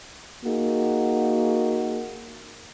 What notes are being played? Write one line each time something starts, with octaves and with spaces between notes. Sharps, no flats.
A#3 D#4 F#4 G#4